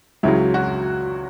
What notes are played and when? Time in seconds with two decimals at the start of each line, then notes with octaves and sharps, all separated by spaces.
0.23 C#2 C#3 F#3 E4
0.54 F#4